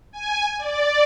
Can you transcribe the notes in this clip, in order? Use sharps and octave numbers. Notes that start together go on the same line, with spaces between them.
G#5
D5